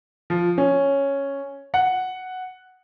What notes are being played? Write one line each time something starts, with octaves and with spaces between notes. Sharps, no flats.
F3
C#4
F#5